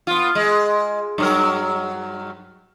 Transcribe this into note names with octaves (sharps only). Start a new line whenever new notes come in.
B3 F4
G#3
G2 F#3 A#4